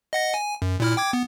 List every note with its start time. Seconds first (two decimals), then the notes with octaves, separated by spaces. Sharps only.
0.13 D#5 F#5 A#6
0.34 G#5
0.62 F#2
0.80 A#2 E4 F6
0.97 G5 D6 G#6
1.13 B3